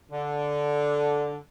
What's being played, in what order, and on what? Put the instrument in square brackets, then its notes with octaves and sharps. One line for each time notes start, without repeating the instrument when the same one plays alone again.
[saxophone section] D3